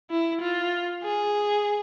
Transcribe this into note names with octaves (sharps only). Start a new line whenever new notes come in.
E4
F4
G#4